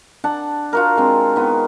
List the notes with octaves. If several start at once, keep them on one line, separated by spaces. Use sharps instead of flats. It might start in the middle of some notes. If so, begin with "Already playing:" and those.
D4 F#5 A5
F4 F#4 A#4
G#3 C4 D4
D#3 B3